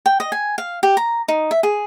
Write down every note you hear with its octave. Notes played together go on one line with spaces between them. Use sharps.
G5
D#5
G#5
F5
G4
A#5
D#4
E5
G#4